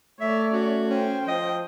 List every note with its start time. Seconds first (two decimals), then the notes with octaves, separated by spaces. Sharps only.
0.21 A3 C#5 D5 E5
0.51 C#4 F#4
0.89 C#4 C5 G5
1.28 F3 D#5